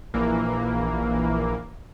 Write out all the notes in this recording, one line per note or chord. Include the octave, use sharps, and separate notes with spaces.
A#1 E3 A#3